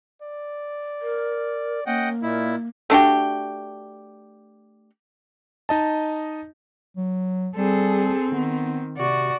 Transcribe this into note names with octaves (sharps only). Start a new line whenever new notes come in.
D5
A#4
A#3 C#4 D#5 F#5 G5
A#2 E4 D#5
A3 D4 F#4 G4
D#4 D#5 A5
F#3
G3 C4 G#4 A4
D#3 B3
C3 F#4 D5